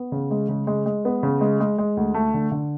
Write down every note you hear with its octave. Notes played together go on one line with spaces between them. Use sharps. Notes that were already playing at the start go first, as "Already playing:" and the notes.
Already playing: B3
C#3
G#3
C#3
G#3
G#3
B3
C#3
G#3
G#3
G#3
D2
A3
D3
D3